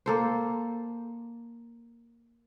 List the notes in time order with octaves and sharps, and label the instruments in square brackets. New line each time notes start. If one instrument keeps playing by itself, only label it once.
[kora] A#3 A4 C5